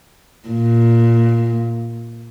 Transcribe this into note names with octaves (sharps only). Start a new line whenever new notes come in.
A#2